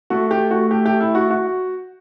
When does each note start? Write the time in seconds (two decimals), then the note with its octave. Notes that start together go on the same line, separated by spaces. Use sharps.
0.10 A3 F#4
0.31 G4
0.51 F#4
0.71 G4
0.86 G4
1.01 E4
1.15 F#4
1.30 F#4